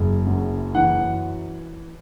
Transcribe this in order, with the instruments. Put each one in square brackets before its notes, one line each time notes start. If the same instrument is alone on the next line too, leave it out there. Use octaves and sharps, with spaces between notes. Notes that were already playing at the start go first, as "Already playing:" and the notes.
Already playing: [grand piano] F#1 C#3
F#2
E3 F#5